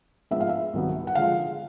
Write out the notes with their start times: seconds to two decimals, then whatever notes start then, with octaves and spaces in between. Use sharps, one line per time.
0.31 G#2 F3 G#3 B3 D4 E5
0.41 F5
0.49 E5
0.73 C2 C3 D#3 F#3 B3
1.07 F#5
1.15 D3 F3 G#3 F5